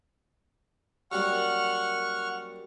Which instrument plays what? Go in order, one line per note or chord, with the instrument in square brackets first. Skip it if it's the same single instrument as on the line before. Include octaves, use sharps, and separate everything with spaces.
[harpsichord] F#2 G3 A#3 [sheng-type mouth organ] F#5 C#6 F6